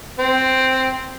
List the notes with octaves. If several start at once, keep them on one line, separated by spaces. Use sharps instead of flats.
C4